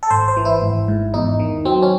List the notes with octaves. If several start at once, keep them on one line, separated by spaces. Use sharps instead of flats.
A4
G#1 C5
C5
E3
E4
G#1
G#2
E2 D#4
D#3
F#3 C4
C#4